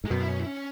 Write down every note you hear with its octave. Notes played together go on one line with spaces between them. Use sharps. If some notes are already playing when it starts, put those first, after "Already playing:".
G#2 G#3
F#2 B2 B3
E4
C#4
E4
C#4